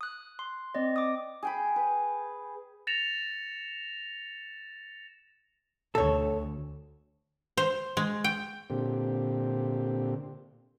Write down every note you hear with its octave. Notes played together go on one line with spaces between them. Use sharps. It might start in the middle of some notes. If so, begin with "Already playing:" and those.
D#6 F#6
C6
C4 D5 D#5
D6 D#6
G#4 G5 B5
B4
A6 A#6 C#7 E7 F7
D2 A4 C#5
C5
G#3
G5
A#2 D3 C4 G4